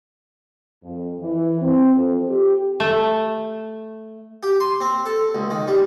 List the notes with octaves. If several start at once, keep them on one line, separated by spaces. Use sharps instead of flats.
F2
E3
C4
F2
G4
A3
G4
C6
C4
A4
C#2
D#3
G3